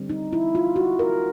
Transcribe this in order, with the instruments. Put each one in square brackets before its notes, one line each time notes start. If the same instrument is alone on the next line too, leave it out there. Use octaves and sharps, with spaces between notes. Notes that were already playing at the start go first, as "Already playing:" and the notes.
Already playing: [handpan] D3 G3 C4
D#4
E4
F4
F#4
A#4